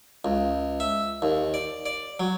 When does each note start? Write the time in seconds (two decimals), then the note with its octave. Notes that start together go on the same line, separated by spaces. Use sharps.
0.25 C#2
0.80 E5
1.22 D#2
1.54 D5
1.86 D5
2.20 F#3